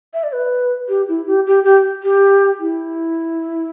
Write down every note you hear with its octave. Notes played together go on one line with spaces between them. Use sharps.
E5
D5
B4
G4
E4
G4
G4
G4
G4
E4